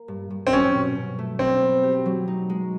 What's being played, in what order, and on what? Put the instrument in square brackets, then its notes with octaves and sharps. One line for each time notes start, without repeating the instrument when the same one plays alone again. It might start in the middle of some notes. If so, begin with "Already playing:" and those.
Already playing: [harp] A#3
G2
G2
[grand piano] C4
[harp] F#3 [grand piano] C#4
[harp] B2
B2
A3
[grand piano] C4 [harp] D4
[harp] B3
G4
F#3
D#4
G#3